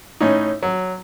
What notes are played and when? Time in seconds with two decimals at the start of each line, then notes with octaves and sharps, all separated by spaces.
0.20 A2 C#4 D#4
0.63 F#3